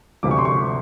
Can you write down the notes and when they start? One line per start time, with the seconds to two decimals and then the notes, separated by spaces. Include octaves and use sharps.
0.23 D2 C3 F3 D6
0.31 C#6
0.38 C6
0.45 C#6